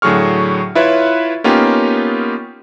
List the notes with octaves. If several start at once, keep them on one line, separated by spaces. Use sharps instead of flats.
A2 D3 F#3 G#4 C#6 F6
E4 F4 B4 C#5 E5
A#3 B3 C#4 D#4 F4 G4